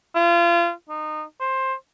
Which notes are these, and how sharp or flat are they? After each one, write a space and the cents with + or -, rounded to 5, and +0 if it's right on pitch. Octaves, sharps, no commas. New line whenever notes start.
F4 -30
D#4 -25
C5 +15